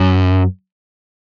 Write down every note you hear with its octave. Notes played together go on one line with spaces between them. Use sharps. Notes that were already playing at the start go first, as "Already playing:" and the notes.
Already playing: F#2